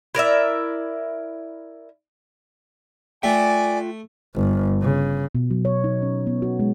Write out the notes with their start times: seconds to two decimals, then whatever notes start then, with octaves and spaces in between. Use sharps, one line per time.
0.15 E4 A#4 D5 E5
3.23 A3 F4 D5 G5 G#5
4.36 G1
4.82 C#3
5.35 B2
5.51 F#3
5.65 C#5
5.84 D#4
6.02 C#4
6.27 B3
6.42 F#4
6.59 G#3